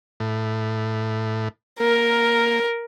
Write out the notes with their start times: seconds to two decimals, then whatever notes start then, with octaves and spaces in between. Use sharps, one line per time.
0.20 A2
1.80 A#3 A#4